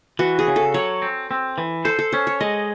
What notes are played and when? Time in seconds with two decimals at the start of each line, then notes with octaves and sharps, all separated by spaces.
0.19 E3 F#4
0.39 G#4
0.48 C#3
0.56 A4
0.74 F#3 C#5
1.02 C4
1.31 C4
1.58 E3
1.85 A4 C5
1.99 A4
2.12 C#4 C5
2.27 C#5
2.41 G#3 D#5